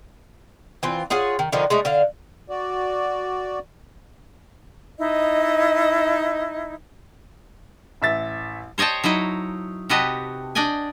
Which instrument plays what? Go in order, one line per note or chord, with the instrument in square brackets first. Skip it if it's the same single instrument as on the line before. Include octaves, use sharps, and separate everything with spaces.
[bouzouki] E3 C4 F4
F4 G#4 C#5 F#5
D#3
D3 D#3 F3 D#4
G#3 A3 D#4
D3 F5
[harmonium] F#4 D5
[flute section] D#4 E4 D#5
[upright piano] A1 E5 A6
[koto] C5 C#5 D#5 G5 A5
F#3 D#4 E4 D#5
C3 F#4 G4 B4 D#5 A5
D4 D5 D#5 G5 G#5